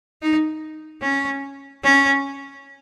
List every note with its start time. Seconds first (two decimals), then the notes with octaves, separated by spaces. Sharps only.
0.22 D#4
1.02 C#4
1.83 C#4